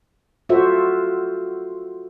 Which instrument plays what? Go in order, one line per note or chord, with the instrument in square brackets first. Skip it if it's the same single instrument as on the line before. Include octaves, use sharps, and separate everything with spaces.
[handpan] F4 F#4 A4 C5 E5